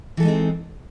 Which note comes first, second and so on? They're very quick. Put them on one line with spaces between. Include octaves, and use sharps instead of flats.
E3 A4 G#3 D#4 C4